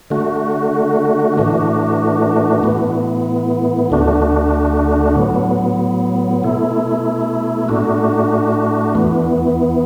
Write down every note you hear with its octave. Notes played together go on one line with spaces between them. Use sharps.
D3 A3 F#4
A2 E3 A3 D4 F#4
A2 E3 B3
D2 D3 A3 D4 F#4
A2 F#3 B3
B2 A3 E4
A2 A3 D4 F#4
E2 E3 B3